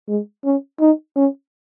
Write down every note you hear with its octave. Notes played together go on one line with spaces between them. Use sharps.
G#3
C#4
D#4
C#4